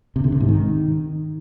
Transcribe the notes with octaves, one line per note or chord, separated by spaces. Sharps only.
C3
D3
C3
G#2
D#3